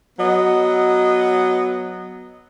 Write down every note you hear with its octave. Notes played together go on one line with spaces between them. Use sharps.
F#3 B3 D#5